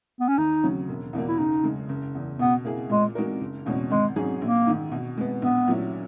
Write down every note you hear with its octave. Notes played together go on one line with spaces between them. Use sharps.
B3
C#4
D#2 D#4
C#3 F#3 C#4
E1
E2 B2 A#3
E4
F#1 D#4
F#2 C#3 G#3
F#1
E2 C#3
B2 B3
A#3 E4 G#4
A#2 G#3
G#3 D#4 F#4 A#4
F#1
E2 B2 G#3 C#4
G#1 G#3
G#2 F#3 C#4 G#4
A#1 A#3
G#2 D#3
B2
G#3 B3
A#1 B3
A#2 F#3 C#4 E4